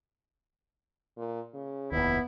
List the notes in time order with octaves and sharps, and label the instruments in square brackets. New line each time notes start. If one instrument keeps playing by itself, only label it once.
[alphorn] A#2
C#3
[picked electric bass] F1 D#2 [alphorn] B3 [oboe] E4